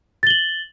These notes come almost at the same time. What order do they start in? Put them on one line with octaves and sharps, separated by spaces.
A6 G7 F#7